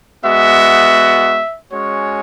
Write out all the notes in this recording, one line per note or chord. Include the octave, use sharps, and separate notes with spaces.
G#3 B3 F#4 E5
G#3 C#4 F#4 C#5